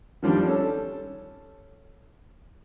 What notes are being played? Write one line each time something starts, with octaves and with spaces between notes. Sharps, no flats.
D#3 F3 G3 C4 D4
C#4 A4